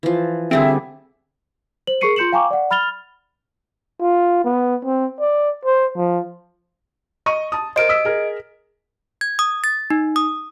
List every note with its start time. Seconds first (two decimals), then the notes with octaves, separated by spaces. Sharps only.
0.03 E3 F3
0.51 D3 G3 C4 G#4 E5
1.87 C5 F#7
2.01 G#4 A#4 C#6 C7 C#7 D#7
2.16 F4 C6 G6 C#7 E7 F#7
2.32 F5 G5 G#5 A#5 C#6 D6
2.51 D5 F#5
2.71 B5 F6 A6 F7 G7
4.01 F4
4.44 B3
4.85 C4
5.20 D5
5.65 C5
5.97 F3
7.26 D#5 C#6 D#7
7.52 A5 D#6
7.76 A#4 C5 D#5 D7
7.89 D#6 E6 B6
8.05 G#4 A#4
9.21 G#6
9.39 D#6
9.64 A6
9.90 D#4
10.16 D#6